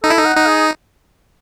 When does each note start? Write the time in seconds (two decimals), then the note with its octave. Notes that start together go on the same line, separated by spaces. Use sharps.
0.03 D#4 A4
0.10 E4
0.17 D#4
0.26 F#5
0.36 D#4
0.47 G#4